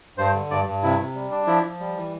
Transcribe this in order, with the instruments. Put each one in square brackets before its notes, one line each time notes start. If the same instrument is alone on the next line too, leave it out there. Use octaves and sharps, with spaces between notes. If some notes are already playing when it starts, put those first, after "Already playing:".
[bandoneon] G2 C5
D3
G2 D5
G2
C3 E4
C3
G3
D4
F3 E4
F3
G3
E3